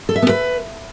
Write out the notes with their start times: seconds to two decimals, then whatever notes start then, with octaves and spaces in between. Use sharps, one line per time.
0.09 A4
0.16 E5
0.22 B3
0.29 B4